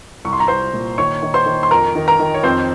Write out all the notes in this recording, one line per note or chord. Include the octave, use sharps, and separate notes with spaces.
C2 C#6
C6
A#5
C2 C5 C6
A#2
D#3 C#5 C#6
D#3
C5 C6
D#3
C6
F2 A#4 A#5
D#3
A#4 A#5
D#3
C#5
F2 C4 C5